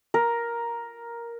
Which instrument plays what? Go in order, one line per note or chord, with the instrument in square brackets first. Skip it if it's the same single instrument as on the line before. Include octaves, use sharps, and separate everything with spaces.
[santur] A#4